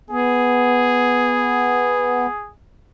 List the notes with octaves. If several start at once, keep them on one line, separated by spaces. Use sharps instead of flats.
B3 G#4